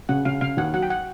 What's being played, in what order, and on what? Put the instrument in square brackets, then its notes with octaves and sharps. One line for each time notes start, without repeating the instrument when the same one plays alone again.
[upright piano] C#3 [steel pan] F#5
[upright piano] C#3 [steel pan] F5
[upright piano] C#3 [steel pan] F5
[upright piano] D#2 [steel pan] F#5
[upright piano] F#3 [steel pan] F#5
[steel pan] G5
F#5